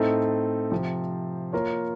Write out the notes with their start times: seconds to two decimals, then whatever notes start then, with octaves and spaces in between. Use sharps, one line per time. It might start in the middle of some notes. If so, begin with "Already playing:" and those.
Already playing: A2 A3 C4 D#4 A4
0.71 C3 F3 C4
1.53 A#3 F4 A#4 C#5